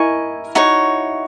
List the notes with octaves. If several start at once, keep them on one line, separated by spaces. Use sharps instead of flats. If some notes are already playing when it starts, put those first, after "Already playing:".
Already playing: E4 A#4 D#5 G#5 C#6
D#4 F#4 C#5